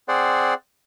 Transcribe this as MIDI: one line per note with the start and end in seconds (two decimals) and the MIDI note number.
0.08 0.54 60
0.08 0.54 68
0.08 0.54 72
0.08 0.54 74
0.08 0.54 78